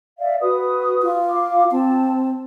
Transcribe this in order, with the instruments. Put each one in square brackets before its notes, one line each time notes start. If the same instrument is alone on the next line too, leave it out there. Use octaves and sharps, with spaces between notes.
[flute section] D5 E5 F5
F#4 B4 D#6
[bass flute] F4
[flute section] F5 D6
[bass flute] C4 [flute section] A5